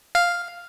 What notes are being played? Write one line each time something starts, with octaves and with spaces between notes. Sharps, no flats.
F5